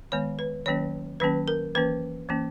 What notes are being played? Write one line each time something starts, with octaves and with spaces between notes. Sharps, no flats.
D#3 G#3 B3 C#5
B4
D#3 F#3 A#3 C#4 C#5
D#3 F#3 A#3 C#4 B4
A#4
E3 A#3 C#4 B4
E3 A#3 C#4